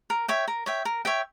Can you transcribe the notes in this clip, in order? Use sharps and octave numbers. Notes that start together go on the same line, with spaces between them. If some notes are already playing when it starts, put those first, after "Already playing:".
A#4
C#5 E5 G5
A#4
C#5 E5 G5
A#4
C#5 E5 G5